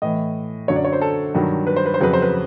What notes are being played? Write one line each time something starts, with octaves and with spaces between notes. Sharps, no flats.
A2 E3 D#5
F#2 D3 F#3 C#5
D5
C#5
C5
A4
G2 D#3 F#3
B4
C5
B4
C5
F2 C#3 F#3 B4
C5
B4